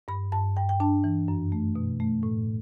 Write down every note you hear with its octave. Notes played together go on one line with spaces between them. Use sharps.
G2 B5
G2 A5
G2 G5
G5
D4 A5
E3
F#2
A3
B2
A3
A2